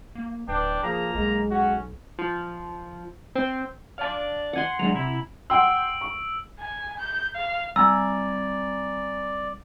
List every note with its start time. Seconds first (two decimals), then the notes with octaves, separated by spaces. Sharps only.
0.15 A#3
0.48 D1 D4 B4 G5
0.83 F3 A#3 G#4 A#5
1.15 B1 G#3
1.51 C#4 F#4
2.19 F3
3.35 C4
3.98 D4 D5 F5 A5
4.53 F#5 G#5 C6
4.79 F#3 G#3 D4 A#5
4.94 C3 E4
5.50 F#5 G5 C6 E6 D7
6.01 C#6
6.60 G#5
6.99 G6
7.35 F5
7.76 G3 C4 D5 G#5 A#5 E6